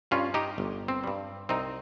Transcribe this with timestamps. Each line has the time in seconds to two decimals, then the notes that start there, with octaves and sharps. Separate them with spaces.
0.11 G2 G3 C#4 F4
0.34 D#4 G4
0.58 G1
0.88 C4
1.04 G2 G3
1.49 C2 C4 D#4